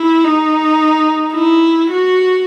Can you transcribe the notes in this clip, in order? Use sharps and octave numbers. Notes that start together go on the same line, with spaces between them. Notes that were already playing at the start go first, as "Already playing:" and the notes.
Already playing: E4
D#4
E4
F#4